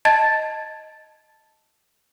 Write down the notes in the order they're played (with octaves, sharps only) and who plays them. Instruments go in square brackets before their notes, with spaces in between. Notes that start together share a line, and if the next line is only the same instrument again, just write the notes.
[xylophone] D#5 A5 G#6 A6